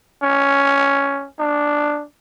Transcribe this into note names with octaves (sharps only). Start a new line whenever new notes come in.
C#4
D4